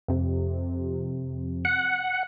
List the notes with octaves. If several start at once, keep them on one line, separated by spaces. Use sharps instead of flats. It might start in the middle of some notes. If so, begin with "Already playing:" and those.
F2 C3
F#5